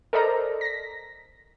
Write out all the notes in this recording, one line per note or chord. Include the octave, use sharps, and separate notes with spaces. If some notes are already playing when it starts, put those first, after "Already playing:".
A4 A#4 C5 D5 D#5 A#5
A#6 B6